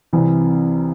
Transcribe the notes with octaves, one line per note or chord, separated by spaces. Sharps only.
C2 C3 E3